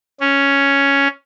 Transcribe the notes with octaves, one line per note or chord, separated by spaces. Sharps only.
C#4